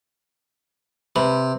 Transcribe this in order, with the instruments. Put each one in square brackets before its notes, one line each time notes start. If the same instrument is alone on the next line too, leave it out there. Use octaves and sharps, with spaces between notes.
[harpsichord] C3 [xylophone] B4 B5